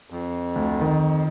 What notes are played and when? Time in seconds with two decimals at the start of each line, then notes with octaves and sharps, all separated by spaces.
0.10 F2
0.56 D2
0.81 D#3